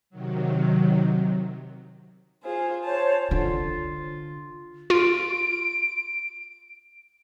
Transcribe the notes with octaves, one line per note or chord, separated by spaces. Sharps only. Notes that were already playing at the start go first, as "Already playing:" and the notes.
C3 D#3 F#3
F4 G#4 C5
C5 C#5 A5
D3 F4
F4 D7